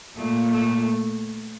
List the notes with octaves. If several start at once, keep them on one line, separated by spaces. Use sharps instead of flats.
A#2 A3
A3